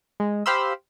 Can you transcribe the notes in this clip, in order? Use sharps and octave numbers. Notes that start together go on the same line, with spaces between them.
G#3
G4 C5 F5 B5 C6 E6